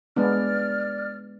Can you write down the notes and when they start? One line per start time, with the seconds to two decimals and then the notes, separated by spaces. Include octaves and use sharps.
0.16 G#3 B3 D4 D5 F6